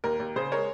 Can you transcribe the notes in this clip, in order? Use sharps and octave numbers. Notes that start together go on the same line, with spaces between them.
D#2 A#4
D#2
C#3 G#4 C5
G#3 A#4 C#5